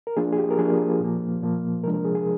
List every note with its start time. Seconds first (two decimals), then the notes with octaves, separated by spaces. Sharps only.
0.07 A#4
0.17 F3 A#3 D4 F4 G#4
0.32 G#4
0.38 G4
0.50 A#4
0.58 F3 A#3 D4 F4 G#4
1.00 A#2 F3 A#3
1.42 A#2 F3 A#3
1.83 C3 F3 G#3 D4 A#4
1.94 A#4
2.05 G#4
2.15 G#4